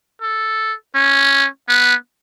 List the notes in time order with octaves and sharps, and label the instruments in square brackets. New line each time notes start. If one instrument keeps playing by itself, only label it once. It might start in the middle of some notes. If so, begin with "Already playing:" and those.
[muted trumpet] A4
C#4
B3